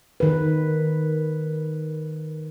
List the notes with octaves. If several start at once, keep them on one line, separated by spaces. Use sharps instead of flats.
D#3 B4